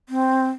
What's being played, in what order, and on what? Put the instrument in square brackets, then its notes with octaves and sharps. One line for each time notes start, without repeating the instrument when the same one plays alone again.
[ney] C4